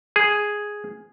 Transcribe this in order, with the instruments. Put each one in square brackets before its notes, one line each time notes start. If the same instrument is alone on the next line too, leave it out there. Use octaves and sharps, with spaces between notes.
[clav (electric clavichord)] G#4